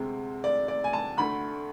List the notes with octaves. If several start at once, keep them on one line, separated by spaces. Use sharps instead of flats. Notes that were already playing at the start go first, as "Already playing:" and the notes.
Already playing: D2 C3 G#3 C4
D5
D5
G#5
A5
D2 D3 A3 B5